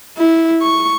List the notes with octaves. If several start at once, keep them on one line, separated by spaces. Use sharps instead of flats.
E4
C#6